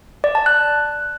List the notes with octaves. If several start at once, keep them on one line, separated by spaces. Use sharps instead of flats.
D5
A5
F#6